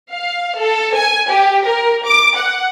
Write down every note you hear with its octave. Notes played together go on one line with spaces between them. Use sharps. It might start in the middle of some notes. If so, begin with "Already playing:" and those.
F5
A4
G#5
G4
A#4
D6
F#5